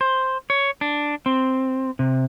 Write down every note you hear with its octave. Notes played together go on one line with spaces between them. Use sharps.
C5
C#5
D4
C4
C3